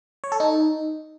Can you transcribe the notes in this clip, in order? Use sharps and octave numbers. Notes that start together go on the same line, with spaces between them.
C#5
A4
D#4